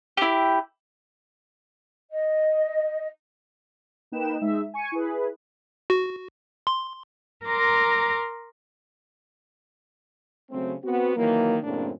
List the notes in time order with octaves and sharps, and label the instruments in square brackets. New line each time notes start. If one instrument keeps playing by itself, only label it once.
[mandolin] E4 G4
[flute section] D#5
[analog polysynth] A#3 D#4 B4 G5 E7
G#3 D#4 E5
G#5 C#6 C#7 D#7
E4 G#4 B4
[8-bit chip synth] F#4
C6
[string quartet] A#4 A#5 C6 D6
[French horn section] C#3 F#3 A3 C4
B3 C4 F#4
D#3 E3 F#3 A#3
F#2 A2 C#3 A#3 C4 D4